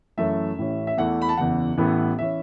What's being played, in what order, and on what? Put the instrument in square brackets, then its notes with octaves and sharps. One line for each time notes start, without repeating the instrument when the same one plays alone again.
[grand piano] F#2 E3 A3 C#4 E5
A1 A2 E3 C#4
E5
E2 E3 A3 F#5
B5
A5
F#1 E2 E3 F#5
A1 A2 E3 B3
E3 C#4 E5